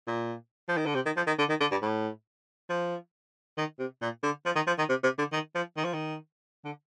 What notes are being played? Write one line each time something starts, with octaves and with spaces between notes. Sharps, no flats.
A#2
F3
D#3
D3
C3
D#3
F3
D#3
D3
D#3
D3
G2
A2
F3
D#3
C3
A#2
D3
F3
D#3
F3
D#3
C3
C3
D3
D#3
F3
D#3
F3
D#3
D3